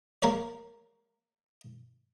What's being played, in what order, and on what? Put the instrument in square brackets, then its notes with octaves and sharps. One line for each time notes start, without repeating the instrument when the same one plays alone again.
[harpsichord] A#3 A#4 C#5 D5